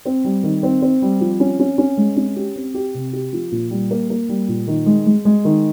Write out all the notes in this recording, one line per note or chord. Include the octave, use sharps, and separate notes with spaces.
C4
G3
D#3
C4
C4
G3
F3
C#4
C#4
C#4
G#3
C#4
G4
C4
G4
C3
G4
F3
A#2
G3
A#3
A#3
G3
A#2
D#3
G#3
G#3
G#3
D#3